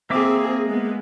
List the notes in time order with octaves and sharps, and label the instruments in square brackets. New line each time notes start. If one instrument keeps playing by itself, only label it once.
[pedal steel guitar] A#3 E5 D6 [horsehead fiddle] C4 G#4
[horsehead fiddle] G#3 B3